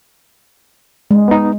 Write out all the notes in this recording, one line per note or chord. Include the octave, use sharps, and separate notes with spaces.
G#3
B3 D#4